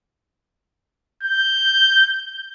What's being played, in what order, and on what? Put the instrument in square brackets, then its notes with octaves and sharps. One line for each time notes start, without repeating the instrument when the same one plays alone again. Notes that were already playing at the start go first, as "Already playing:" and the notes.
[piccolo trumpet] G6